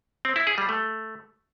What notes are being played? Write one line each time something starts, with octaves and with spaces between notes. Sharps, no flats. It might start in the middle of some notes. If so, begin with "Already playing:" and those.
C4
E4
G#4
G3
A3